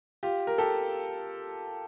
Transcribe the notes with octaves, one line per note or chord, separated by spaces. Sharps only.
F4 G4
A#4
G4 A4